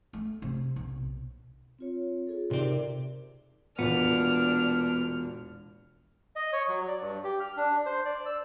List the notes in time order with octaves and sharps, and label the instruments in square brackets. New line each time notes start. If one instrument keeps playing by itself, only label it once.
[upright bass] A3
C3
B1
[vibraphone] C4 F4 C#5
F4 G#4 A4
[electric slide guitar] C3 G4 [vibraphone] D#4 A#4 D5
[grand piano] E1 A#2 [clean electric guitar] B3 [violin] D4 F6
[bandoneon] D#5
C#5
F#3
D5
G2
G4
F6
D4
C5
D5
E6